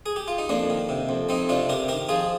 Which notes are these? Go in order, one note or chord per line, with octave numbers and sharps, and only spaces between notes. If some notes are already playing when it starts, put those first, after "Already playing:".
G#4
G4
F4
D#4
F2 A#3 D4
D#3
C3
F2
F2 C4 D#4
C3 D4 F4
C3 G4 A#4
D#3 G4 A#4
F3 F4 G#4